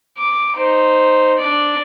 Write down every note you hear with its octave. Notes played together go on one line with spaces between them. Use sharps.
D6
D#4 C5
D4 D5